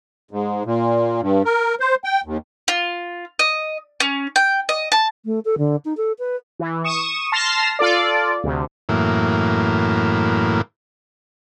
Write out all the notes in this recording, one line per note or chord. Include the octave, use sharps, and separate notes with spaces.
G#2
A#2
G2
A#4
C5
G5
D#2
F4
D#5
C#4
G5
D#5
A5
A3
A4
D3
D#4
A4
B4
E3
C#6 D#6 E7
A5 C6 F6 A#6 C7 E7
F4 A4 D5
D2 C3
F#2 A2 E3 A#3